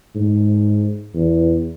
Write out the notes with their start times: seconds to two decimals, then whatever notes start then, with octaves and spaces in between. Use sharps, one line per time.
0.15 G#2
1.14 E2